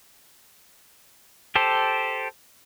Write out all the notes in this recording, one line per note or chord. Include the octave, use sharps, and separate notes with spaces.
G4 A4 C5